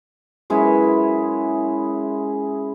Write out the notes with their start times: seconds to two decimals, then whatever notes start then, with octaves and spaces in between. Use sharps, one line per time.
0.50 F#2 G#3 E4 B4